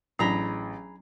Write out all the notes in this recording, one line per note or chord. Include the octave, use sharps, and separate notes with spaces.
A1 F#3 D4 G#4 A#5 B5